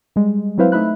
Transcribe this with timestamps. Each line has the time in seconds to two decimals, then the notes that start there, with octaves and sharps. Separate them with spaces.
0.16 G3 G#3
0.58 F#3 C4 E4 B4 C5 F5
0.72 A3 D#4 E5 B5 F#6